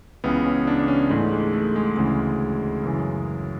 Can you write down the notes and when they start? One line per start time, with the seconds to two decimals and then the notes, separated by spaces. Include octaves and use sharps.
0.24 C#2 C#3 E3 B3
0.46 C#4
0.67 D4
0.79 D4
0.88 C#4
1.10 G#2 E3 A3
1.32 G#3
1.53 A3
1.76 G#3
1.97 D2 C#3 E3 G#3
2.83 F#2 C#3 E3